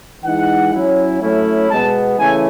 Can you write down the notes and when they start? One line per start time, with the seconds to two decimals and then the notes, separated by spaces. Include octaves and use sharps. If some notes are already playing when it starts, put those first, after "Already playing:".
0.23 E3 G#3 D#4 F#5
0.72 F#3 C#4 E4
1.20 F#3 A3 C#4 E4
1.69 B2 G#3 B3 A5
2.18 C#3 E3 A3 E4 G#5